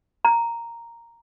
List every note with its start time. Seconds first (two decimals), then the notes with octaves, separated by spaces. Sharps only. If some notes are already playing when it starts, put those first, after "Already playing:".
0.25 A#5